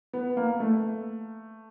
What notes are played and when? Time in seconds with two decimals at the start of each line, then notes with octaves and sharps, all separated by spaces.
0.13 B3
0.37 A#3
0.60 A3